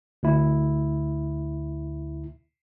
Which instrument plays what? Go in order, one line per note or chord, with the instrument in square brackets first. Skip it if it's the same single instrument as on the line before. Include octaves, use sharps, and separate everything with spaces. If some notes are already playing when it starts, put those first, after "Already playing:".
[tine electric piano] D2 E4